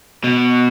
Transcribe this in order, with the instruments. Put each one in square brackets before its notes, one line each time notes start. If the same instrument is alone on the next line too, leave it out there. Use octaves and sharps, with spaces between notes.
[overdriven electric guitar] B2